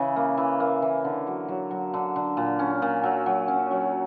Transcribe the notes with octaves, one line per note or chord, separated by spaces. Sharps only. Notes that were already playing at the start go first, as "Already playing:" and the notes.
Already playing: C#3 E3
A#3
E3
A#3
E3
D3
F#3
F#3
F#3
D3
D3
A#2
C#4
A#2
F#3
F#3
C#4
F#3